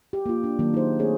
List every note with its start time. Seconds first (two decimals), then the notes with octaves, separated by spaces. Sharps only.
0.13 G4
0.26 A#3 F4
0.44 D4
0.59 D#3 F#3 A#3
0.74 D#4 G#4 C5
0.99 A3 C4 G#4 C#5